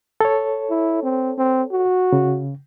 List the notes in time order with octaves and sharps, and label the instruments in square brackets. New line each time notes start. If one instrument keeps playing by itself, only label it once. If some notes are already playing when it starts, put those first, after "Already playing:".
[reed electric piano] A4 C#5
[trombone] E4
C4
C4
F#4
[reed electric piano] C#3